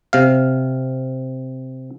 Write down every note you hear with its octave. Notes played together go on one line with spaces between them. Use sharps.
C3 F5